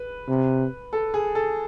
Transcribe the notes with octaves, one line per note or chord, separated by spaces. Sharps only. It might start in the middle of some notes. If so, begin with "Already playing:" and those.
Already playing: B4
C3
A4
G#4
A4